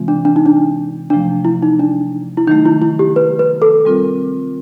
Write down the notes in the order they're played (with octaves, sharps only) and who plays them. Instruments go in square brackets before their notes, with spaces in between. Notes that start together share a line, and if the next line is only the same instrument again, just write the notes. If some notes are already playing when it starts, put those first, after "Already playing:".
Already playing: [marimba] C3 E3 G#3 C4 F4
[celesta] D4
D4
D#4
D4
[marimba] C3 F3 A3 [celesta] D4
[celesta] E4
D#4
D4
E4
[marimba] D#3 F#3 A3 [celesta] D#4
[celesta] E4
E4
G4
B4
B4
A4
[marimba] G3 C4 F4 A#4